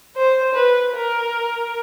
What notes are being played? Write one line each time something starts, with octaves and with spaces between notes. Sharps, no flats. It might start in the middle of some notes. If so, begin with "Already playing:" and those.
C5
B4
A#4